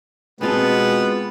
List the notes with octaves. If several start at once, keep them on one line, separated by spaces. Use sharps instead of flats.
B2 G#3 B3 C4 F4 F#4 G#4 A5